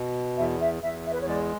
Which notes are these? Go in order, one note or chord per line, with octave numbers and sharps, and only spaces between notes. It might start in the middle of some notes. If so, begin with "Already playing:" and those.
Already playing: B2
E2 E5
E5
E2 E5
E5
B4
C#5
G#3 D5